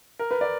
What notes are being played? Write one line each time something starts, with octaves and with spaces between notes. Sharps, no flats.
A#4
B4
D5